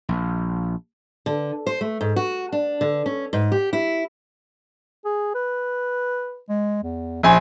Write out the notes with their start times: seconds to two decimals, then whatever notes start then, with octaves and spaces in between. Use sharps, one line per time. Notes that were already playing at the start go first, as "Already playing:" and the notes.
0.09 A#1
1.26 D3
1.67 C5
1.81 A3
2.01 G#2
2.16 F#4
2.52 D4
2.81 D3
3.06 C#4
3.33 G#2
3.52 G4
3.73 E4
5.05 G#4
5.35 B4
6.49 G#3
6.83 E2
7.23 A#1 C#4 G#5